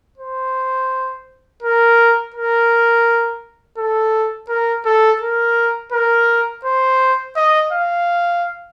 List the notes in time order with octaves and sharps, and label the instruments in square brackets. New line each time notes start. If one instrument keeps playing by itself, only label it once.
[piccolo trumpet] C5
A#4
A#4
A4
A#4
A4
A#4
A#4
C5
D#5
F5